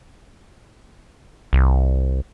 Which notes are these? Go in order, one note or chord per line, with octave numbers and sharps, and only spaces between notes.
C2